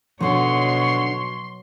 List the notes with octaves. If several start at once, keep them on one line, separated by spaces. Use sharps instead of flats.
B2 D3 F#3 D#4 C#5 C6